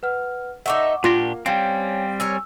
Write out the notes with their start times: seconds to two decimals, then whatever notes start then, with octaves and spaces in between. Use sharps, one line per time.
0.03 B4 F#5 F6
0.66 D#4 A4 E5 F#5 C#6 D6
1.04 A#2 A#3 D4 F4 G4 A#6
1.46 G3 C4 C#4 F5 G5
2.20 A#4 C#5 G#5 E6